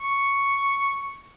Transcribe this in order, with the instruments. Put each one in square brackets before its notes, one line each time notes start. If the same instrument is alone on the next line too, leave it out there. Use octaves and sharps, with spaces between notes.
[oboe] C#6